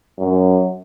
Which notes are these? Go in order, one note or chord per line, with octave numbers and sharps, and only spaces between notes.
F#2